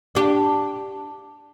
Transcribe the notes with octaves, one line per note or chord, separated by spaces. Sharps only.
D4 G4